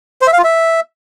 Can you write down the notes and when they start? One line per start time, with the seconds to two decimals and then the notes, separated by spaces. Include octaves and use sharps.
0.22 C5
0.27 E5
0.33 F5
0.38 F4
0.44 E5